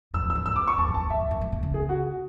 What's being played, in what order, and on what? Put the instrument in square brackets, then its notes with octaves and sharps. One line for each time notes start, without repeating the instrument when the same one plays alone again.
[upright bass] F#2 [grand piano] E6
[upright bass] E2
[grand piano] E6
[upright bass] F#2
[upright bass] G#2 [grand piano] E6
[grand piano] D6
C#6
[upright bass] E2 [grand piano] A5
[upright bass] F#2
[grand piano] A5
[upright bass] E2
[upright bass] F#2 [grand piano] E5
[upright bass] F#2
F#2
G#2
B2
C#3
[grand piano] G#4
F#4